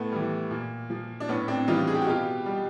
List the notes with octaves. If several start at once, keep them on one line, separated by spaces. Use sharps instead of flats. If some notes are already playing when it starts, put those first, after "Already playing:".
Already playing: A2 A3 B3
E3 G3
A#2
F3
D4
A2 B3 C#4
C4 D4
E3 G3 D#4 F4
G#4
G4
F#4
B2 F4 G4
G3